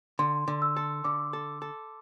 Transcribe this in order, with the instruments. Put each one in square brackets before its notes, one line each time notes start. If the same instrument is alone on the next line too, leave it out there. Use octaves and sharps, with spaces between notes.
[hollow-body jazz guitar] D3 [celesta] C6
[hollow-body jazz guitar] D3
[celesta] E6
[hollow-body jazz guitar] A4
[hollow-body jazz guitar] D3 [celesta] D6
[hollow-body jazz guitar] A4
A4